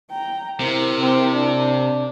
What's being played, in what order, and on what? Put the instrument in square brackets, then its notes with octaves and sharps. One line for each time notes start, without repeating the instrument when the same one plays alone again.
[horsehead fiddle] G5 A#5
[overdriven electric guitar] C3 [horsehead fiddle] E4 A#4
[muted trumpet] C4
D4